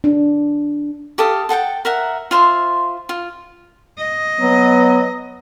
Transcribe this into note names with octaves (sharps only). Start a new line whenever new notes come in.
D4
G4 A4 F5 D#6
A4 F#5 G5 A5
A#4 E5 F#5
F4 C5 E5 C6
F4
D#5
F#3 B3